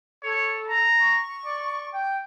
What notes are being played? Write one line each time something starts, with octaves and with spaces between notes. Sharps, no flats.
A4 C#5
A#5
C#6
D5
G5